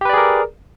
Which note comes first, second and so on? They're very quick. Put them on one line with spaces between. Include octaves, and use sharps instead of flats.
G4 B4 D5 G#4 A#4